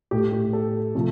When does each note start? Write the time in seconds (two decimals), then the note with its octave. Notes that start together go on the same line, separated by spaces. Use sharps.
0.11 A2 A3 G4
0.32 G4
0.53 A4
0.95 C3 F3 A3